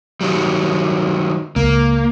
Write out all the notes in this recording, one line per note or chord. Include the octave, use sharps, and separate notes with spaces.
D#3 F#3 G3
C#2 A#3